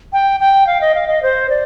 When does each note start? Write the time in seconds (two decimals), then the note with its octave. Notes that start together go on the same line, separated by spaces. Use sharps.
0.13 G5
0.40 G5
0.67 F5
0.81 D#5
0.95 F5
1.08 D#5
1.23 C5
1.50 D5